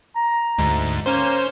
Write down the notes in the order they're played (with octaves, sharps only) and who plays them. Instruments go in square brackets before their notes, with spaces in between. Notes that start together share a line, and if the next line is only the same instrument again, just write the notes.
[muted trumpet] A#5
[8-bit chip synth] D2 G#2
[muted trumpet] A#3 [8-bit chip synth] C#4 C5